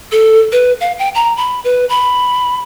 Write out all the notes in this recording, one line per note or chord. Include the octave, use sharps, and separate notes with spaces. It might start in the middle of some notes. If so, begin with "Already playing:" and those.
A4
B4
F5
G5
A#5
B5
B4
B5